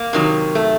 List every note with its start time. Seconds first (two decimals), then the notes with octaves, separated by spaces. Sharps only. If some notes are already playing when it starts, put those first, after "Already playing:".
Already playing: A#3
0.13 C3 D#3 F#3
0.55 A3